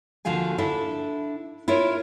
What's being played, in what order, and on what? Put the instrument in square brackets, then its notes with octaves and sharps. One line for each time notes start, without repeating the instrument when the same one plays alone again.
[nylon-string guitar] D#2 D3 F3 F#4 F5 G#5
D4 E4 A4 E5
E4 F4 A#4 C#5